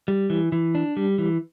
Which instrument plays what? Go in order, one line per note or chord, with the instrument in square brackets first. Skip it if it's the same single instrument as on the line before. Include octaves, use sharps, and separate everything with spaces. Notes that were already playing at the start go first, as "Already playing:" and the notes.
[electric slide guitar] G3
E3
E3
D4
G3
E3